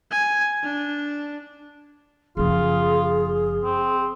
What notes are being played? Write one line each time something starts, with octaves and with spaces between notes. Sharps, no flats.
G#5
D4
F#1 F3 F4 G#4
C4